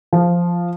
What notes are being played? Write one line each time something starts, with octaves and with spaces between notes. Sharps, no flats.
F3